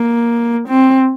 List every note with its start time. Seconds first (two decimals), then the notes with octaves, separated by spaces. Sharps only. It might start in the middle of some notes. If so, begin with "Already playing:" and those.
Already playing: A#3
0.68 C4